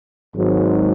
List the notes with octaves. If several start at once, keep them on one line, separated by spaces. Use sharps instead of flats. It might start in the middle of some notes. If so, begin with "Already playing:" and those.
G#1 G#2 F#3